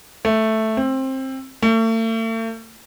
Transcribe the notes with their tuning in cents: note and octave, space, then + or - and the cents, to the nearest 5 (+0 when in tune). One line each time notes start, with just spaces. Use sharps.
A3 +0
C4 +20
A3 +40